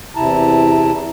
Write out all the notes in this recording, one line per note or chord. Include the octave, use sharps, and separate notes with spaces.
E2 C3 E4 A5 A#5